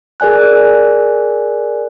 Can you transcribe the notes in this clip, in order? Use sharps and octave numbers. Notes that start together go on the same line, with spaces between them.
G#4 A#4 D5 G#5 F#6